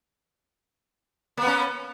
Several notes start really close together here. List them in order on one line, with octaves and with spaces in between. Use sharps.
A#3 B3 C#4